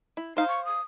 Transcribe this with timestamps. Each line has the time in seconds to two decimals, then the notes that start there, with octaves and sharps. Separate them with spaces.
0.17 E4
0.37 D#4 C5 F5
0.48 C#6
0.65 D#6